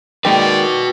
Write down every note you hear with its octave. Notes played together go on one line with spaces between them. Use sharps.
D#3 G#3 A#3 F#4 B4 D5 G5